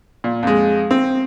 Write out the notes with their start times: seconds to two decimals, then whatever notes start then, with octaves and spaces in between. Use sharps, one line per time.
0.24 A#2
0.43 F2 G#3
0.91 C4